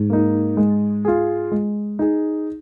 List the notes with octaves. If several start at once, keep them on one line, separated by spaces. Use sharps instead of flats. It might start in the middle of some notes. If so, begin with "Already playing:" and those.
Already playing: G#2
A#3 D#4
G#3
F4 G#4
G#3
D#4 G#4